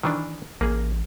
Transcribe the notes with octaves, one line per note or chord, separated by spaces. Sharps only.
D#3 E3 D4
A1 A#3 G#4